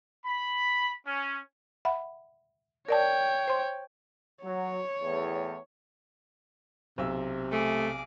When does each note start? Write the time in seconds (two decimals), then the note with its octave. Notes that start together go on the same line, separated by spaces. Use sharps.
0.25 B5
1.07 C#4
1.85 E5 F#5 B5
2.89 A#4 C#5 D5 G5 A5
3.48 C5 C6
4.44 F#3 C#5
5.02 E2 A2
6.98 B1 C3 E6
7.52 A3 G#4 D6